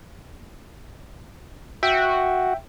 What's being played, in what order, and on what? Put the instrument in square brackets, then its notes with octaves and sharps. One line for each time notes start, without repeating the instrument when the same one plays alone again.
[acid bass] F#4 [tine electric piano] E5 G5